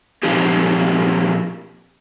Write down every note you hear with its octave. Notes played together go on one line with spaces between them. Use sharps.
A#2 F3 C4 D#4 G4